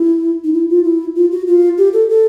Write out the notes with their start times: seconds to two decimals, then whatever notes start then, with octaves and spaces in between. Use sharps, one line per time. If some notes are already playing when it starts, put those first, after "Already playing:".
Already playing: E4
0.44 D#4
0.53 E4
0.70 F4
0.84 E4
1.15 F4
1.31 F#4
1.47 F4
1.78 G4
1.93 A4
2.09 A4